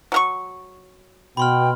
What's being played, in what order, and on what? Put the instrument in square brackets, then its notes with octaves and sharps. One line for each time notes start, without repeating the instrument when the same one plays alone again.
[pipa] F#3 A#4 C#6
[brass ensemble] B2 [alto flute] G5 [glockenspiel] B5 C6 F6